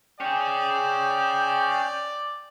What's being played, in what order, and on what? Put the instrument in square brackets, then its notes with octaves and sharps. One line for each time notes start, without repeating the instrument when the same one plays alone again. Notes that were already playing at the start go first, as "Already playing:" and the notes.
[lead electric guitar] C#4 G#4 [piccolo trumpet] D5 [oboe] G5